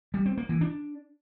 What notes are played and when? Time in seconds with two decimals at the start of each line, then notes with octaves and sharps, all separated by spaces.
0.14 G3
0.26 C4
0.37 A#3
0.49 E3
0.61 D4